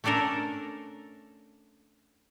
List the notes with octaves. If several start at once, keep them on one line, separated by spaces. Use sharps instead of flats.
A3 C#4 D4 A4 A#4